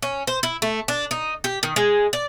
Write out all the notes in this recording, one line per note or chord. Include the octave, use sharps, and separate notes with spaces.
C#4
C5
E4
A3
D4
D#4
G4
D#3
G#3
D5